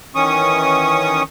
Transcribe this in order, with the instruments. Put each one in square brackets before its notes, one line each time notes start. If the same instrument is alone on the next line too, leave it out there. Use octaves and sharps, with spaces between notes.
[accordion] D#3 E3 C#4 C#6 D#6